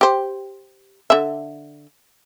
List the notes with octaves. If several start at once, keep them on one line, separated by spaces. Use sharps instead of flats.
G4 C5
D3 E5